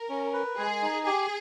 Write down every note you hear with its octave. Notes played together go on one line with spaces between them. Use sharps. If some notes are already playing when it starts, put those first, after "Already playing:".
Already playing: A#4
C#4
B4
G#3 G#4
D#4
G4 G#4